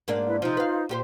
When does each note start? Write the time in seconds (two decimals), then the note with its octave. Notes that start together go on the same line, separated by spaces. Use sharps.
0.08 G#2 A#3 D4
0.26 E4 B4
0.42 C3 F3 D#4 F4 C5
0.57 B4 F5
0.89 A#2 G4 C5